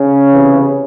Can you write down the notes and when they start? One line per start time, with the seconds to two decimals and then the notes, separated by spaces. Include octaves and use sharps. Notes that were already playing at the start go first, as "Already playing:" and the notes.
Already playing: C#3 C#4
0.32 C3 E3